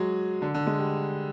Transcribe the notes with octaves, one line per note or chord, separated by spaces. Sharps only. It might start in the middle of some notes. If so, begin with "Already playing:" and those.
Already playing: F#3 G#3
D3
D3
G#3
G3